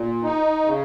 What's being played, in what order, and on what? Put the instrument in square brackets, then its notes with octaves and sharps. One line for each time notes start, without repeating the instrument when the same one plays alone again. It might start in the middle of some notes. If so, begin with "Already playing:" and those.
Already playing: [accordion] A#2
D#4
C#3